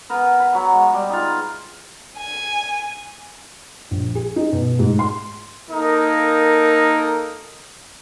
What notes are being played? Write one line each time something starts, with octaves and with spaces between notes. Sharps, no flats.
B3 A#4 B4
B5
F#3 F#5
G#3
G3
D#4 F4
G#5
A#1
G#4
D#4
B2
G#2
C6
A#3 D#4 A4 A#4